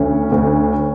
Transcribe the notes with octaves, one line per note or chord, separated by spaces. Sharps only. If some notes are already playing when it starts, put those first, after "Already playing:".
Already playing: D2 C#4
D2